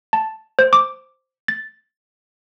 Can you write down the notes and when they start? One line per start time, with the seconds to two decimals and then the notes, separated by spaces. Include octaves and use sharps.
0.13 A5
0.59 C5
0.73 D6
1.48 A6